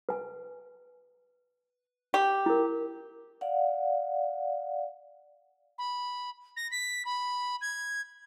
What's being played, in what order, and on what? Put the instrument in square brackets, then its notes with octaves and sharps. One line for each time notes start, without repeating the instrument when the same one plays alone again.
[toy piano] B4 G#5
[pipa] G4
[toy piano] E4 A#4
[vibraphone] D5 F5 F#5
[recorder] B5
A#6
B6
B5
G#6